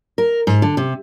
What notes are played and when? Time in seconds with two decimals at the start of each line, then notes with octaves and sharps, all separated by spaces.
0.18 A#4
0.47 G#2
0.62 D3
0.77 C3